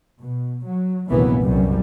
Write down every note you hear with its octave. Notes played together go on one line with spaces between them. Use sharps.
B2
F#3
F1 A#1 D#2 E3 F#3 B3
F#1 C2 F#2 G3